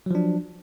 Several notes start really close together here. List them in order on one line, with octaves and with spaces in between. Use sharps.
F#3 F3 D4